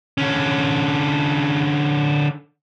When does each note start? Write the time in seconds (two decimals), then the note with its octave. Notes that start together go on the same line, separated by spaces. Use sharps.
0.18 D3 C#4